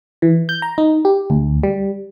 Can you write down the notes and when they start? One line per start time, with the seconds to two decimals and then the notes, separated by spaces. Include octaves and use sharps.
0.22 E3
0.49 G6
0.62 A#5
0.78 D#4
1.05 G4
1.30 D2
1.63 G3